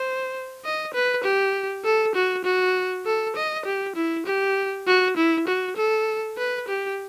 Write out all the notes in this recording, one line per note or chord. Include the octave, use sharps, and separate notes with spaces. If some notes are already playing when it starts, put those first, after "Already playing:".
Already playing: C5
D#5
B4
G4
A4
F#4
F#4
A4
D#5
G4
E4
G4
F#4
E4
F#4
A4
B4
G4